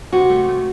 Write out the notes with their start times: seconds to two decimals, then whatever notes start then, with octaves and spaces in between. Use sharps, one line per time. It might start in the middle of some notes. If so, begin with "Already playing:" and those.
0.12 C3 F#4
0.30 A3
0.48 A3